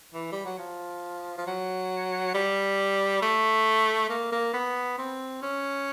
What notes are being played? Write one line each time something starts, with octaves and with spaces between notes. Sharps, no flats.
E3
G3
F#3
F3
F3
F#3
G3
A3
A#3
A#3
B3
C4
C#4